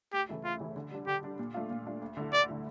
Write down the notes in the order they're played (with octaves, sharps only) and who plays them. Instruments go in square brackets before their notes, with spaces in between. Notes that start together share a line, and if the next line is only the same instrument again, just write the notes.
[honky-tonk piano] D2 [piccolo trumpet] G4
[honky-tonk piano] C#3 E3 A3 E4
[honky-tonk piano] D2 [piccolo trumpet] F4
[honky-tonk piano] C#3 E3 A3 E4
D3
G3 D4
[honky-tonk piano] D3 [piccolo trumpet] G4
[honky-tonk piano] G3 D4
A#2
A3 D4 F4
A#2
A3 D4 F4
D2
D3 A3 E4
[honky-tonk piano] D2 [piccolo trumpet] D5
[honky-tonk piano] D3 A3 E4